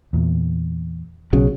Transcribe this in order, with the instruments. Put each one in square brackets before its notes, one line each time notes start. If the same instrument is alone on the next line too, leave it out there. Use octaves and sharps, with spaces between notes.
[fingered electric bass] E2 A#2
[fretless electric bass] B1 C#3 F#3